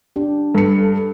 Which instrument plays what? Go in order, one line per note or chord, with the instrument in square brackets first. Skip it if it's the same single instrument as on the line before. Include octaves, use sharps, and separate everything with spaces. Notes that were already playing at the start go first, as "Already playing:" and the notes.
[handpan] D4 G4
[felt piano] G2 C#7 [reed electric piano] A4